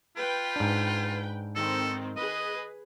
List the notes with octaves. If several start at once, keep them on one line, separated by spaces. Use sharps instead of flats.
F4 B4 G5
G#2 D4
D#3 C4 A4
G#4 B4 D#5